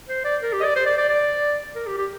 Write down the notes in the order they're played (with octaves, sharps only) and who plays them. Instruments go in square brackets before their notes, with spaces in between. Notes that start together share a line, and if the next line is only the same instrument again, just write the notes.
[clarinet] C5
D5
A#4
G4
D#5
D5
C5
D5
D5
D5
A#4
G4
G4